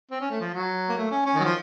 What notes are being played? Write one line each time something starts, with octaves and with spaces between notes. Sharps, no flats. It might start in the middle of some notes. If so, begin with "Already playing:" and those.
C4
C#4
A3
F3
F#3
A#3
A3
C#4
C#4
D#3 F#3
F3